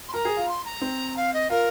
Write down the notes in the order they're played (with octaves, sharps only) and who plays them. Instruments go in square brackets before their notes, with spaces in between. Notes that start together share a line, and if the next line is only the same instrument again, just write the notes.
[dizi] C6
[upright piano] A#4 [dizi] A#5
[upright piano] G#4
F4
[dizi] C6
A#5
[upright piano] C4
[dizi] F5
D#5
[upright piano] F4 [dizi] A#4